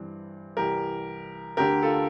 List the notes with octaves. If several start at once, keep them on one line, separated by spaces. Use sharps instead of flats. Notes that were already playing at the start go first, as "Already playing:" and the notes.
Already playing: G2 E3 C4
C2 C3 E3 G4 A#4
D2 D3 G4 A#4
F4 A4